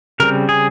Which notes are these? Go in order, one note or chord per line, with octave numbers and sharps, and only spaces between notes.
C#3 G3 C4 A#4
G#4